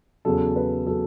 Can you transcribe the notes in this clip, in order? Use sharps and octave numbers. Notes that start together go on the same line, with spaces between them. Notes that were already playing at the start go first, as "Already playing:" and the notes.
E2 C#3 F#3 A4
B4
C#3 F#3 A4